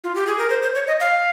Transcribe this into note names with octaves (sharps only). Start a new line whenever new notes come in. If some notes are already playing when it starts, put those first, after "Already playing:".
F4
G4
G#4
A#4
C5
C5
C#5
D#5
F5